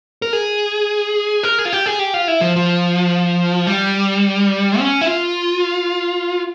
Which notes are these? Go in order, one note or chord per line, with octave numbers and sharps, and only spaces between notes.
A#4
G#4
A#4
G#4
F4
G4
G#4
G4
F4
E4
F3
F3
G3
C#4
E4
F4